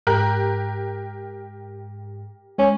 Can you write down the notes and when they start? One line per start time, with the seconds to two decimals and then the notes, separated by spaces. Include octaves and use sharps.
0.07 G#2 G4 A#4 F#6
2.58 G#3 C#4